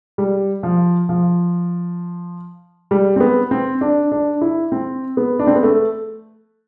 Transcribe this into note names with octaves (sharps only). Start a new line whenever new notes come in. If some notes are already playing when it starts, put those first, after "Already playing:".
G3
F3
F3
G3
C4
B3
C4
D4
D4
E4
C4
B3
D4
C4
B3
A3